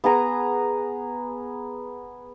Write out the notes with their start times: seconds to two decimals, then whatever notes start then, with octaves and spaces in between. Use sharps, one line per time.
0.04 B3 G#4 A#5 D#6